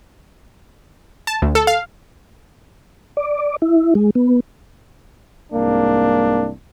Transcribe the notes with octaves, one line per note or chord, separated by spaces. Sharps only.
A5
D2
A4
F5
D5
E4
G#3
B3
C2 G#2 A#3 D4